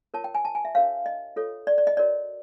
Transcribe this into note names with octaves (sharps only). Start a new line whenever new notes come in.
F4 A#4 C#5 A5
G5
G#5
A5
G#5
E5
D4 G4 A#4 C#5 F5
D#5
F4 A4 C#5
D5
D5
D#5
F#4 A#4 C#5 D5